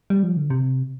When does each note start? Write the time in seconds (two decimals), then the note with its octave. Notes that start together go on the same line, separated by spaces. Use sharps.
0.10 G3
0.23 F3
0.37 D3
0.50 C3